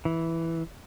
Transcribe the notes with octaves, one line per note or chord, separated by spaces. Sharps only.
E3